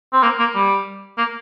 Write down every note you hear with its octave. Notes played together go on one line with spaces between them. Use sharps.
C4
A#3
A#3
G3
A#3